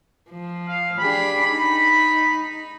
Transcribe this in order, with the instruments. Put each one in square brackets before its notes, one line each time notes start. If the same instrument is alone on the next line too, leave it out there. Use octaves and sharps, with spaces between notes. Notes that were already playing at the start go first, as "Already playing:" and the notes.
[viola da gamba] F3
[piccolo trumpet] F5
[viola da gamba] D4 G4 G#4 [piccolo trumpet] B5
[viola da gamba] D#4 [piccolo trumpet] B5